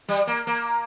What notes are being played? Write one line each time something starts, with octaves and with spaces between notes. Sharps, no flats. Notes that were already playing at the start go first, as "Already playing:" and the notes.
G3
A#3
A#3